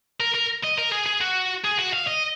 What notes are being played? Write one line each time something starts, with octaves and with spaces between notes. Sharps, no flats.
A#4
A#4
D#5
A#4
G#4
G#4
F#4
G#4
F#4
F5
D#5